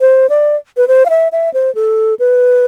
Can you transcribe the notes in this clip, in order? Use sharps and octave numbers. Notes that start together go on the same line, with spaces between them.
C5
D5
B4
C5
F5
E5
E5
C5
A4
B4